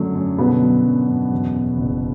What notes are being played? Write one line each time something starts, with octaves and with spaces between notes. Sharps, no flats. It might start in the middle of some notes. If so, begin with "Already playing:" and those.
Already playing: F#2 D3 F#3 A3
F#2
B2 D3 B3
F#3
F#2
F#2
E2
B2
F#1